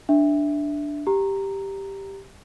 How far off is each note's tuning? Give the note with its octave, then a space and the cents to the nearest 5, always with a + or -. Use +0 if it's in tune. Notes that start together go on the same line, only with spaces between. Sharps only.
D4 +0 E5 +0
G4 +0 A#5 -5